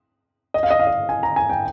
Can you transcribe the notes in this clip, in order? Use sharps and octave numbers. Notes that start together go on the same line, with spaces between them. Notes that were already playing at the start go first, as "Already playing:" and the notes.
D#5
F5
D#5
F5
D#5
G#5
A#5
G#5
G5